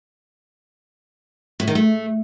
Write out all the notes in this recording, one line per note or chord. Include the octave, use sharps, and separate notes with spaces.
A2
D#3
A3